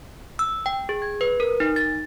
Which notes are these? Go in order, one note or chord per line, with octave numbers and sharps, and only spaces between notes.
E6
G5
G#4
G#6
B4
A#4
D#4
A6